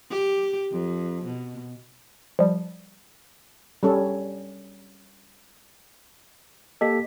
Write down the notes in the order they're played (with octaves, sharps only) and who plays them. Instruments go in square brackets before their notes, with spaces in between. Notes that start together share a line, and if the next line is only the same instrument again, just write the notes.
[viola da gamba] G4
F2
B2
[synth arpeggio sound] F3 G3
[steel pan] G3 C#4 A4
[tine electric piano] A#3 G4 A4 [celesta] D#5 B6